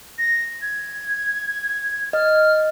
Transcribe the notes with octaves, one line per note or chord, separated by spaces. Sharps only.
A#6
G#6
D#5 F6